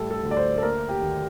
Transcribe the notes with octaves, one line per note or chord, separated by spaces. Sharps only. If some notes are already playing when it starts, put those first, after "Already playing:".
Already playing: A2 G3 A4
A4
D2
D5
C5
A4
A#3 A#4
G4
D#2